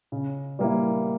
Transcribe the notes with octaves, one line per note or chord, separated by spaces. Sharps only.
C#3
G3 A#3 E4